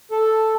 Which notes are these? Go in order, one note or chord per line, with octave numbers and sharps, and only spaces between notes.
A4